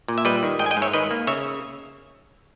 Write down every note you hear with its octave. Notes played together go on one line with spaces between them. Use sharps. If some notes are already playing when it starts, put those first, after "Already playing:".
A#2
E5
G3 B4 D#5
D#3
G#2 D#5 G5
G#5
D#5 G5
G#2
C#5 E5
D#3 B4 D#5
A#3
C#3 C#5 E5